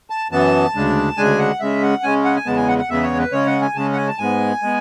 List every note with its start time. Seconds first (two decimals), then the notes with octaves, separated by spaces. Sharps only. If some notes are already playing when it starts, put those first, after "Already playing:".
0.10 A5
0.31 F#2 E3 B3 A5
0.75 D2 C#3 G#3 D4
1.17 D2 C#3 G#3 D4 G#5
1.38 F#5
1.60 C#3 G#3 C#4 E5
1.83 F#5
2.03 C#3 G#3 C#4 G#5
2.24 F#5
2.36 G#5
2.46 E2 C#3 G#3 B3 A5
2.57 G#5
2.68 F#5
2.78 F#5
2.90 E2 C#3 G#3 B3 E5
3.03 C#5
3.19 B4
3.32 C#3 G#3 C#4 C#5
3.46 F#5
3.62 G#5
3.75 C#3 G#3 C#4 A5
3.93 F#5
3.97 G#5
4.08 A5
4.18 G#2 G#3 B3 G#5
4.63 G#3 B3